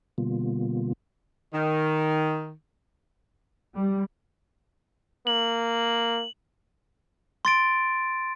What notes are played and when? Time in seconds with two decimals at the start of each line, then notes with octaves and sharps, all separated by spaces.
0.18 B2 D3 G3 A#3 B3 F4
1.54 D#3
3.75 G3
5.27 A#3 F#7
7.45 C6 A6 D7